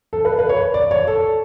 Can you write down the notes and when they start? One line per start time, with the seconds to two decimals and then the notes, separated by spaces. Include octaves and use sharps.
0.13 A4
0.25 B4
0.39 B4
0.49 C#5
0.74 D5
0.91 C#5
1.07 A4